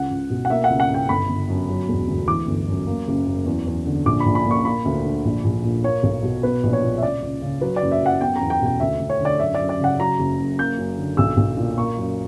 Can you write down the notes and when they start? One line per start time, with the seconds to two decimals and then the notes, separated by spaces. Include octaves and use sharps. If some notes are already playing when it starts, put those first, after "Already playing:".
Already playing: C#2 F#5
0.11 C#2
0.30 B2
0.45 F#5
0.50 A#3 E5
0.64 F#5
0.70 C#2
0.80 F#5
0.89 C#3 G5
1.09 G1 B5
1.29 G1
1.49 F#2
1.69 F#3
1.89 E1
2.08 D2
2.27 E3 D6
2.47 G1
2.67 F#2
2.87 A#3
3.07 F#1
3.26 F#2
3.46 E2
3.67 E2
3.86 D3
4.06 A#1 D6
4.20 B5
4.26 A#1
4.35 B5
4.46 A#2
4.51 C#6
4.65 A#3 B5
4.85 D2
5.04 D3
5.25 A#1
5.44 A#1
5.64 A#2
5.84 A#3 C#5
6.03 B1
6.23 B2
6.43 B3 B4
6.63 A#1
6.73 C#5
6.82 A#2
6.98 E5
7.02 C#2 D5
7.22 C#2
7.42 C#3
7.61 F#3 B4
7.76 D5
7.82 F#1
7.91 E5
8.02 F#2 F#5
8.21 B3 G5
8.36 A#5
8.41 E2
8.50 G5
8.61 B2 G5
8.80 D2 E5
9.00 D2
9.09 C#5
9.20 D3 D5
9.39 F#2 E5
9.54 F#2 D5
9.69 D5
9.80 C#3 F#5
9.99 F#3 A#5
10.19 F#1
10.38 F#2
10.59 A#3 G6
10.78 F#2
10.98 D3
11.17 B1 E6
11.37 B1
11.57 A#2
11.77 A#3 C#6
11.98 F#2